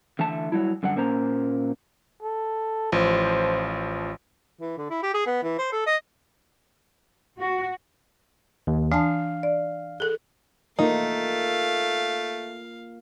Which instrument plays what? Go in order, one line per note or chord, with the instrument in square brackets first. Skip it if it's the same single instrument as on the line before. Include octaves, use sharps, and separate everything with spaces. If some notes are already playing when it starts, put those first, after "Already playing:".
[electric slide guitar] D3 E3 A3 A5
F#3 G3 E4
F#2 D3 G3 F#5
A#2 A#3 C#4 C5 A#5
[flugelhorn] A4
[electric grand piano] A1 F3 [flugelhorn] C5
[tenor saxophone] E3
D3
E4
G4
G#4
B3
E3
C5
A4
D#5
[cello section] F#4
[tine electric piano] D#2
[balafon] E3 D4 [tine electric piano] F5 [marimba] G#5 A5
[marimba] D5
[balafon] G#4 A4
[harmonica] A3 [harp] A#3 F4 [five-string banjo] D#4 [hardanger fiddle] F5